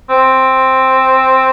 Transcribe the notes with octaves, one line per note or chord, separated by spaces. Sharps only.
C4